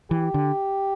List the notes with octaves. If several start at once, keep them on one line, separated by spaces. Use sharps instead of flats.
E3 G4
D3